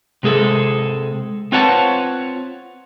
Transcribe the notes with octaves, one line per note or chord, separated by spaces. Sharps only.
C3 G#3 G#4 A4
C4 F4 B4 C#5 F#5 A5